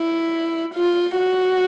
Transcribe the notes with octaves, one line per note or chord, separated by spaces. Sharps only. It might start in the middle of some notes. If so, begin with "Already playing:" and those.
Already playing: E4
F4
F#4